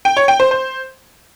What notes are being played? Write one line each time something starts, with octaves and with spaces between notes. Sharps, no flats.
G5
C#5
G5
C5
C5